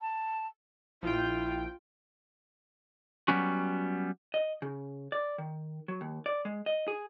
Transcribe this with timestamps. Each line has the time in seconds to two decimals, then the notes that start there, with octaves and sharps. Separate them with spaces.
0.01 A5
1.03 A#1 E4 F4 G5
3.28 F#3 G3 B3 C#4 F#4
4.34 D#5
4.62 C#3
5.12 D5
5.38 D#3
5.88 F#3
6.01 D#2
6.26 D5
6.45 G#3
6.66 D#5
6.88 G#4